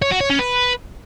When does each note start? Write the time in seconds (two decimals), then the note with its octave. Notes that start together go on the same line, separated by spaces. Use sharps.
0.02 C#5
0.11 F#4
0.20 C#5
0.30 C#4
0.39 B4